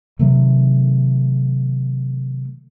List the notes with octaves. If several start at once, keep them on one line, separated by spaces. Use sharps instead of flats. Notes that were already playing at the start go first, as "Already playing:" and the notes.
C3 D#3 F#3 A3